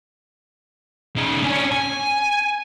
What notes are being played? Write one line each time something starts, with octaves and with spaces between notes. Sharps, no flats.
C#3 D#4
C#4 D4
G#5